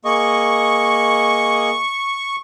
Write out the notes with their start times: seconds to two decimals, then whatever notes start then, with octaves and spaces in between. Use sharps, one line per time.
0.05 A#3 G#4 D#5 C#6